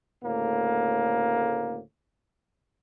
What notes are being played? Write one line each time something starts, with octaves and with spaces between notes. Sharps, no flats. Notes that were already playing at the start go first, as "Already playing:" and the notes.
D2 A2 C#3 A#3